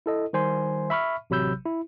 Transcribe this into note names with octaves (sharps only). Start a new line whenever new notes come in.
E4 A4 D#5
D#3 G3 C5 G#5 C6
E5 B5 C#6 F6
A1 C3 F#3 B5 E6 G6
E4